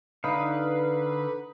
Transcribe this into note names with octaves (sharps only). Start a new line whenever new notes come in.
D3 D#4 B4 F5